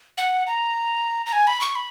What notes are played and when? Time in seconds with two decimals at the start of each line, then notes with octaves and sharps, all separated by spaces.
0.18 F#5
0.47 A#5
1.26 A#5
1.33 G#5
1.47 B5
1.61 C#6
1.75 B5